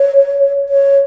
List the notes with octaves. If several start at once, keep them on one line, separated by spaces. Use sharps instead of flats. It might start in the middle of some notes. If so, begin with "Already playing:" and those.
Already playing: C#5
C#5